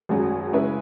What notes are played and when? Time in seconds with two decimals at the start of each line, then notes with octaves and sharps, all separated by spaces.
0.09 G#1 F#2 F#3 C#4 G#4
0.52 C#3 G#3 C#4 E4 B4